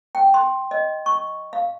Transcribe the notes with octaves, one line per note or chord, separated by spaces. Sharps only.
G5
C6
D#5
C#6
F5